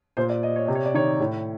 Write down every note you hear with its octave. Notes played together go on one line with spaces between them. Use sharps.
A#2 C5
D5
D#5
C#5
C3 D5
C#5
D5
D#3 C#5
A2